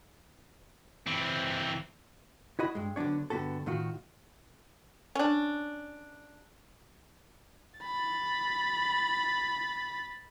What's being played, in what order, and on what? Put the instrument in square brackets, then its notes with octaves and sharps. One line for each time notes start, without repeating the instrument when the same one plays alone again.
[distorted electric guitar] E3 C4
[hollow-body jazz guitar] E4 F#4 D#5 B5
G2 G#3
D3 F#3 B3 D4 C#5
G2 D3 B3 F#4 A4
A2 D#3 F4 F#4
[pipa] C#4 D4
[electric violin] B5 A6